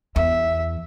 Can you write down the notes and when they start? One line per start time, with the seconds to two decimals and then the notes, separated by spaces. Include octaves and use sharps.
0.16 E2 E5